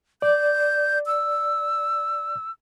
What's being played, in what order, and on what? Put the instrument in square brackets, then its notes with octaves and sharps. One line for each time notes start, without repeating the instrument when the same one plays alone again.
[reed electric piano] D5 [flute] G6
[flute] E6